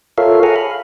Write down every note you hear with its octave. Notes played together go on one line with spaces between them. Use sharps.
F4 A4 A#4 C#5 E5 F5
G#4 A4 F5 F#5 G#5 A#5
F5 B5